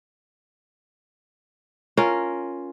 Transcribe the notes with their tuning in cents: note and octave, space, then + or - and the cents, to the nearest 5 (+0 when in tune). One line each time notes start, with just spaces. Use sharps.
C#4 +0 F4 +0 A#4 +0